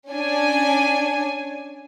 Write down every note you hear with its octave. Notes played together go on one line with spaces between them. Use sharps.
C#4 D4 G#5